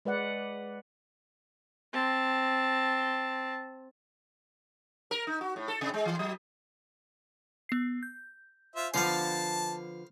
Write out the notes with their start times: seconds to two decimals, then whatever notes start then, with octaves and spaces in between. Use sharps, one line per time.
0.05 G#3 B4 D5 F#5
1.93 C4 A5
5.11 A#4
5.27 D#4
5.41 F#4
5.56 A2
5.68 A4
5.81 C3
5.94 G#3
6.06 E3
6.19 F#3
7.69 B3 C7
8.03 G6
8.76 F4 C5 E5
8.94 D3 F3 B3 C5 F5 A5